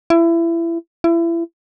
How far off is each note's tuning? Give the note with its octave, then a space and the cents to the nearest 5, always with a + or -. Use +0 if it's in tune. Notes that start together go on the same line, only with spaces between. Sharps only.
E4 +25
E4 +30